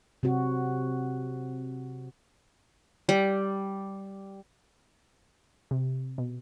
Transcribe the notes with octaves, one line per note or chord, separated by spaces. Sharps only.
C3 C4 F#4
G3
C3
B2